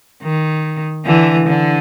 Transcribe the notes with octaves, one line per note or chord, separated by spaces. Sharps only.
D#3
D3 E3
D3